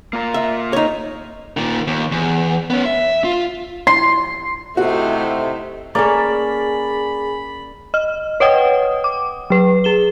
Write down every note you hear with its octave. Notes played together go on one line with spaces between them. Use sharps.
A#3 F4 A#4
E5
D#4 C#5
A#2 D#3
D#2
E2
B3 C#4
E5
F4
C6
C3 A3 D#4 E4 F#4 C5
A#3 C#4 G#4 A4 D5 G#5 B5
D#5 F6
B4 C#5 D#5 F#5 G5 D#6
D6
F#3 B4
G#4 E7 G7